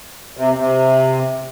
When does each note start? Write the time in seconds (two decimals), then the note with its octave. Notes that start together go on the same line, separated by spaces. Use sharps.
0.37 C3
0.56 C3